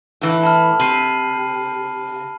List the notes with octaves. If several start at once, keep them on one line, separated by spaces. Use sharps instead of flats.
A2 E3
A5 B5 F6
C3 C7 D#7 F#7